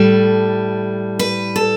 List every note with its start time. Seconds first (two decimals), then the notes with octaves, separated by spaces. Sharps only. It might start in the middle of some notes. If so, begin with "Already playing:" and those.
Already playing: A2 G3 A4
1.19 B4
1.56 A4